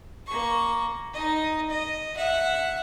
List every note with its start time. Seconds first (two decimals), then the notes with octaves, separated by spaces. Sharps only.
0.27 A#3 C#6
1.13 D#4 D#5
1.70 D#5
2.16 E5 F#5